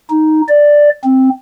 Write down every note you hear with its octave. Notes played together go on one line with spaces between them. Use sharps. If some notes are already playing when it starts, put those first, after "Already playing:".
D#4
D5
C4